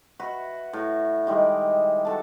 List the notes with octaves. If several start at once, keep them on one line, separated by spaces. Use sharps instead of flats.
F#4 B4 E5
A2
D#3 G3 G#3
F#4 A4 A5